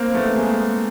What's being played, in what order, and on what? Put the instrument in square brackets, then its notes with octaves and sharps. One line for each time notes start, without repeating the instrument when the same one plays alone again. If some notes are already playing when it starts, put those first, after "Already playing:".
Already playing: [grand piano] A#3 C4
A3 B3
G#3 A#3